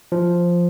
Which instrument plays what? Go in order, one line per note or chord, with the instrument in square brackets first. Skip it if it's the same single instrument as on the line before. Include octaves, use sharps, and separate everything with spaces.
[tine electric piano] F3